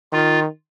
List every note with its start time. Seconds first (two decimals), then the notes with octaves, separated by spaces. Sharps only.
0.13 D#3 F4